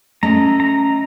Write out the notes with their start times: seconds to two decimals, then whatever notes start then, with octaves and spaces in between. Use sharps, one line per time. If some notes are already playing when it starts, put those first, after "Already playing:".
0.23 A3 C#4 D#5 A#5
0.60 A#5